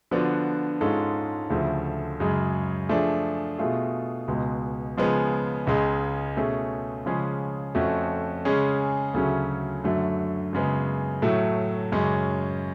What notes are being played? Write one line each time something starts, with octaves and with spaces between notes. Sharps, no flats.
D3 F3 B3 D4 F#4
G#2 G#3 C#4 F4 A4
D2 C#3 F3 A3
F#2 C#3 G#3
F3 A3 D4 G#4
B2 A3 F4 G#4
C#2 B2 G#3
C#3 F3 G#3 B3
C#2 C#3 G#3
B2 A3 C#4 G#4
C#3 F3 G#3 C#4 G#4
F2 F3 A3 C#4 F#4
C#3 G#3 C#4 G#4
D2 C#3 F#3 A3 C#4
F#2 D3 F#3 A3
F#2 C#3 G#3 B3
A2 F#3 A3
F#2 C#3 G#3 C#4